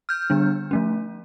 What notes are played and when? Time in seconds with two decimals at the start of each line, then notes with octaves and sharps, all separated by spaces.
0.09 F6 G6
0.30 D3 G3 B3 D4
0.71 F3 A3 C#4